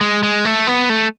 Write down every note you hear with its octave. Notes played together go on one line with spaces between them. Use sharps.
G#3
G#3
A3
B3
A3